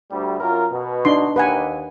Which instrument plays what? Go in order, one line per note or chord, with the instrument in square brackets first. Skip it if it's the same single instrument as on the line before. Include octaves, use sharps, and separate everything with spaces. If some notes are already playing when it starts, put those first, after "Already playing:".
[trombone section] D2 G3
F#2 F4 A#4
B2
[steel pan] D4 D#4 C6
[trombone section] D#2 [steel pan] B4 F#5 G#5